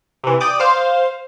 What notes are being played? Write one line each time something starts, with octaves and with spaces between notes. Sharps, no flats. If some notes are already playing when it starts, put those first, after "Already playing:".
C3 E3
D5 G5 D6 D#6
C5 F5